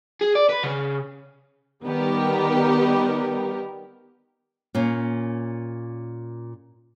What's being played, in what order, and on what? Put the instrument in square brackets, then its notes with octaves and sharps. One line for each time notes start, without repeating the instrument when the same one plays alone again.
[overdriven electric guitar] G#4
D5
B4
C#3
[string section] D#3 G3 B3 G4 A#4
[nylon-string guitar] A#2 A#3 C#4